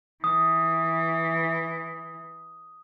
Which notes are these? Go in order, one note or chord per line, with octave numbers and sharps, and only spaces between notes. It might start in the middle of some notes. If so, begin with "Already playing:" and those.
E3 D#6